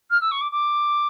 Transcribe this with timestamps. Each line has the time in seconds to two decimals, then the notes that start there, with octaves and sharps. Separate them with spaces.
0.10 F6
0.21 E6
0.31 C#6
0.41 D6
0.52 D6